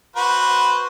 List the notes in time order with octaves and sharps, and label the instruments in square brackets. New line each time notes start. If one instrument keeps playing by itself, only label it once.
[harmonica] F#4 B4 C5